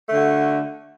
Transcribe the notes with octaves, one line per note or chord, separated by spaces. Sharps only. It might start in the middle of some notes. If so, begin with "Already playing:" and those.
D3 A3 F#4